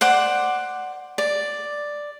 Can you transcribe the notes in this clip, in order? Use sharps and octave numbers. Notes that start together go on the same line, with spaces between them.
C5 D5 F#5 D6
D5